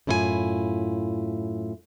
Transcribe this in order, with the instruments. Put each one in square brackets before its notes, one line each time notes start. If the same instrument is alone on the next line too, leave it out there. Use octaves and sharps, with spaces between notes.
[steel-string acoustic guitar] F#2 A2 E4 F4 G#4 G#5